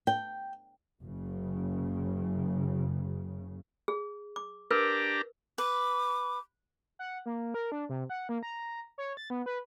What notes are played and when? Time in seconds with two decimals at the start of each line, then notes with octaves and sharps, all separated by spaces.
0.07 G5
1.00 F#1 C#3
3.88 G#4
4.36 D6
4.71 D4 G4 A#4 B4 A#5
5.58 B4 D6
6.99 F#5
7.26 A#3
7.54 A#4
7.72 D4
7.89 C3
8.10 F#5
8.29 A#3
8.43 A#5
8.98 C#5
9.17 A6
9.30 B3
9.46 B4